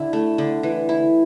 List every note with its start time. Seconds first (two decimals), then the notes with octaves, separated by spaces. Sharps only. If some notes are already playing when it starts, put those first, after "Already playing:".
Already playing: D3 E4
0.13 A3
0.38 D3
0.63 E3
0.89 E4